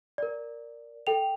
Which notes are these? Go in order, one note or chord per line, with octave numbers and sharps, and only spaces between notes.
A#4 D5
A4 G5 F7